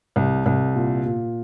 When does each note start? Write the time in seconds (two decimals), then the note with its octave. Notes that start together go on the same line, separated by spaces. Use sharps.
0.16 C2
0.46 C2
0.76 A#2
1.06 A#2